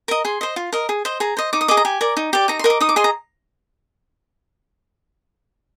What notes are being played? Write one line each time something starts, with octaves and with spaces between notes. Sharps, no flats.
A#4 D#5 A#5
G#4 C6
C5 D#5
F4
A#4 D#5
G#4
C5 D#5
G#4 A#5
C5 D#5
D#4 D6
D#6
G#4 D#5 D6
A#5
G4 G#5
A#4 D5
D#4
G4 D5
D#4 A#5
C6
A#4 D#5 D#6
D6
D#4 D#6
D6
G#4 D#5 C6
A#5